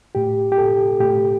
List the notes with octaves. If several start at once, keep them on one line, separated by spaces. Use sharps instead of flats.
A2 G4
G4
A4
A2 G4